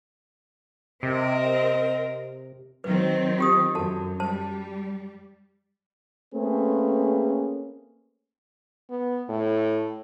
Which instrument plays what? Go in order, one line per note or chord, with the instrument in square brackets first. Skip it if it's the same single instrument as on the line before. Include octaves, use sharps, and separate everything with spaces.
[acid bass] C3 [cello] C4 A#4 [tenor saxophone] D#5
[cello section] D#3 F#3 C4 [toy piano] B4
[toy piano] F4 G4 D#6
[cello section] F#2 [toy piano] F#4 A4 A5
[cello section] G3 [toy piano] C5 A5
[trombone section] A3 A#3 C4 C#4 G#4 B4
[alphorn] B3
A2